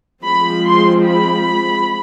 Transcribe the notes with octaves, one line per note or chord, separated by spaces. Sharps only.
F3 G#3 C4 B5
C6
B5